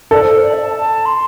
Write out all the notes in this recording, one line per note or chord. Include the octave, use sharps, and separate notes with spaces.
A4 D5
C5
C5
D5
E5
A5
A5
C6